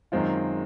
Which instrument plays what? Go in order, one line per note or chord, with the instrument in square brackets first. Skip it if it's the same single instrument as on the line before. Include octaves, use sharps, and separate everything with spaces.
[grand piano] F#2 D#3 G#3 C4 F4